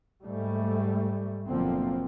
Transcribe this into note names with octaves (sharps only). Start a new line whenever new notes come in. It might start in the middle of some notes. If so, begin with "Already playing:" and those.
G#2 G3 A3
F#1 B2 D3 F3 A#3 C4